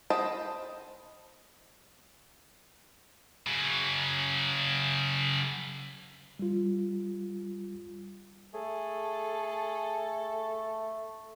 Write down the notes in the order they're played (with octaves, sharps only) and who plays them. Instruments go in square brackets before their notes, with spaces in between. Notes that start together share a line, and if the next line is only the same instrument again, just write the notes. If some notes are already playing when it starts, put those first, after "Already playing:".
[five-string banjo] C5 D#5 G5 A5 B5
[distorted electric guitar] C#3 F#3
[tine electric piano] G3 F4
[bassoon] A3 [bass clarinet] G#4 [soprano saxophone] A4